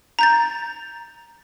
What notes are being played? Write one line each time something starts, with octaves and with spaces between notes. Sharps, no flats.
A#5 G6 A6